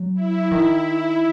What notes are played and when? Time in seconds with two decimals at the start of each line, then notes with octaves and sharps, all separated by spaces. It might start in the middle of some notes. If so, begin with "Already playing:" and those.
Already playing: F#3
0.14 E4
0.51 D#3